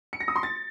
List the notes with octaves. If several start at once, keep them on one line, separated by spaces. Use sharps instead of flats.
C#7
A#6
D#6
C6
A6